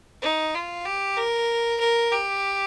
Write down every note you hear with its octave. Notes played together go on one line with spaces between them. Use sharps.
D#4
F4
G4
A#4
A#4
G4